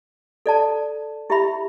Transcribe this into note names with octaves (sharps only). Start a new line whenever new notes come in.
A4 D5 A5
E4 G4 E5 B5